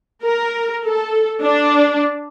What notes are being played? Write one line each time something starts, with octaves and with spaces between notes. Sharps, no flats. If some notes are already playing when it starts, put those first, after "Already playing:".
A#4
A4
D4